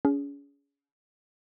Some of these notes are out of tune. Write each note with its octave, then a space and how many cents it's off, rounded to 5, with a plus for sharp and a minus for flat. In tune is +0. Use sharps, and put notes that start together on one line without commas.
C#4 +35 G#4 +5